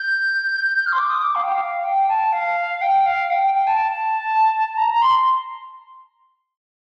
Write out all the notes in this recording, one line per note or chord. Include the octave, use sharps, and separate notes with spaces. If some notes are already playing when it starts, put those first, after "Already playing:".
Already playing: G6
G6
F6
C6
D6
D#6
D6
F5
G5
F5
G5
A5
F5
G5
F5
G5
G5
G5
A5
A#5
A#5
C6